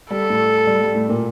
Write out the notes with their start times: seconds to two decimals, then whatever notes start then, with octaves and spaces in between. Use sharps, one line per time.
0.11 G3 A4
0.30 A2 A3
0.67 G3
0.82 G3
0.94 A2 A3
1.09 A#2 A#3